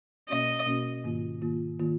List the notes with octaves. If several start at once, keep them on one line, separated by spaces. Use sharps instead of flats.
B2 A#3 C#4 F#4 D#5
B2 A#3 C#4 F#4
G#2 D#3 A#3 F4
G#2 D#3 A#3 F4
D#3 A#3 F4